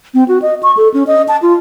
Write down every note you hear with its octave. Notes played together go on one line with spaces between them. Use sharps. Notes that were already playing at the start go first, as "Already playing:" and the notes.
C4
F#4
D#5
C#6
A4
C#4
D#5
A5
F4